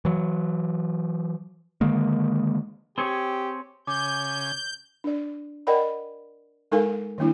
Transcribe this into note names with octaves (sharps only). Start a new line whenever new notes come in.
E3 F#3
D3 D#3 G#3 A#3
C4 G4 G#4 C#5
C#3 G#5 D6 G6
D4 D5
A#4 D5 D#5 F#5 G5 B5
G#3 D#4 A4 A#4 F5 G#5
D#3 G3 A#3 D4 E4